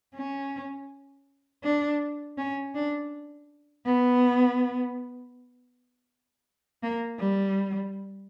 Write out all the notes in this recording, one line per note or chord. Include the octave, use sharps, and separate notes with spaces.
C#4
D4
C#4
D4
B3
A#3
G3